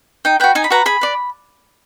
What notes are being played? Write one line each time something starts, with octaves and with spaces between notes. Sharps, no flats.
D#4 G5
F#4 B4 G5
D#4 G#5
B5
F#4 B4 A#5
G#4 B5
B4 D5